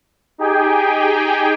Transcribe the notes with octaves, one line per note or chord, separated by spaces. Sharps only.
D#4 G4 G#4 G5 G#5